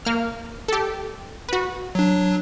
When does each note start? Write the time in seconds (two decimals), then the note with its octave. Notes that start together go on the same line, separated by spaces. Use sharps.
0.05 A#3 F6
0.68 G4 A4
1.49 F#4 B4
1.95 F#3 D4